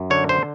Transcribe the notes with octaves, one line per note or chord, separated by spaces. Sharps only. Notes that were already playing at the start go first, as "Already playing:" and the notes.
Already playing: F#2
D3 C#5
C5